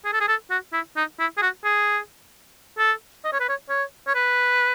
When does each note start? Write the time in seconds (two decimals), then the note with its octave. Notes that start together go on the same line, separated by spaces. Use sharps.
0.05 G#4
0.13 A4
0.20 G#4
0.28 A4
0.50 F#4
0.73 E4
0.96 D#4
1.19 E4
1.37 G#4
1.42 F#4
1.64 G#4
2.78 A4
3.24 D#5
3.33 C#5
3.40 B4
3.48 C#5
3.69 C#5
4.07 C#5
4.15 B4